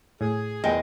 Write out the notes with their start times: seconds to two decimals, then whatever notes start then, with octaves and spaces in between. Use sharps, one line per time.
0.21 A2 G#4
0.64 E2 G2 A#2 G#3 G5